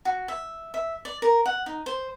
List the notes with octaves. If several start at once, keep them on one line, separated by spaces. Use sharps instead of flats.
F#4
E5
E5
D5
A#4
F#5
D#4
C5